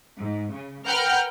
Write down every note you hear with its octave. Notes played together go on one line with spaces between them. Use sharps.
G#2
C#3
A#4 B4 F#5 G5 F6 G6